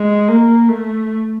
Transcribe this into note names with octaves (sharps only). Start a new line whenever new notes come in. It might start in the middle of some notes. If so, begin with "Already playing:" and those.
Already playing: G#3
A#3
A3